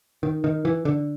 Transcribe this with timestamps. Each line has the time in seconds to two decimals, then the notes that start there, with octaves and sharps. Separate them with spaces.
0.23 D#3
0.44 D#3
0.65 E3
0.85 D3